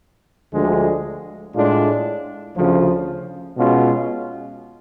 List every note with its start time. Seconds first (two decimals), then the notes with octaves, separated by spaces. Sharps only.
0.53 D2 D3 F3 G#3
1.55 A2 G#3 D4 F4
2.56 D2 C#3 F3
3.57 B2 G#3 C#4 F4